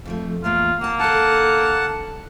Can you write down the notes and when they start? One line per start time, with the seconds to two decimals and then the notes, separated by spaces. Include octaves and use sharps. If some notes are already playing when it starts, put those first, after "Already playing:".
0.05 F2 F3 A3
0.44 E2 A3 A#3 F4
0.81 A#3 F#5 A5
1.00 D3 A4 F#5 A5